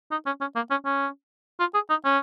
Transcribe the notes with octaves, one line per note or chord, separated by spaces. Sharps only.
D#4
C#4
C#4
A#3
C#4
C#4
F4
G#4
D#4
C#4